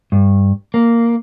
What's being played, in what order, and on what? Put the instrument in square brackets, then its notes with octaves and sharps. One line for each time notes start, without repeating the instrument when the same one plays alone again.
[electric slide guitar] G2
A#3